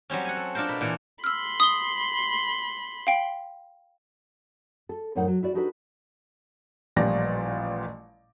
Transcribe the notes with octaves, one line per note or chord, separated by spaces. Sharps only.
F#3 G3 C4 C#4
F#5 G#5
A4
D4 F4 A4 A#4 C5
B2 B5
A#2 E3 A4
B5 C6 E6 F6
D#6 G7
F5 G5
A4
F#2 A2 F#3 D#4 C5 F#5
F#3
E4 F#4 D5
D4 D#4 F#4 G4 A4 B4
A1 A#2 F3 G3 D5 A#6